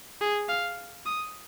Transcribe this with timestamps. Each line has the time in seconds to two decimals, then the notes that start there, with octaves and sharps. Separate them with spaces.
0.21 G#4
0.49 F5
1.06 D#6